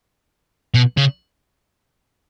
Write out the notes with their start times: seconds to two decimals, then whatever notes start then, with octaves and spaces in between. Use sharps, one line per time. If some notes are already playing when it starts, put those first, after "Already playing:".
0.74 B2
0.97 C#3